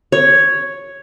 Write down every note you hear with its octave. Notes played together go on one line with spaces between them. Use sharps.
C#5